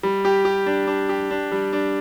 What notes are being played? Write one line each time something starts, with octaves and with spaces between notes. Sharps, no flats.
G3
G4
G4
D4
D4
G4
D4
G3
D4